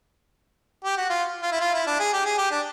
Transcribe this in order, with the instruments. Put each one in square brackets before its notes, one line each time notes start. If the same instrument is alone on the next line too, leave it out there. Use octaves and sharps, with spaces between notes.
[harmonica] G4
F#4
F4
F4
E4
F4
E4
D4
G#4
G4
G#4
G4
D4